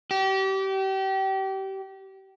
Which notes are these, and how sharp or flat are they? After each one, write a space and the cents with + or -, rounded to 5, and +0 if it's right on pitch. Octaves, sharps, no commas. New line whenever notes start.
G4 -30